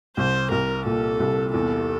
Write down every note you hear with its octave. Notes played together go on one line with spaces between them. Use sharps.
C2 C5
C2 A#4
A#2 A4
C2
E2 A4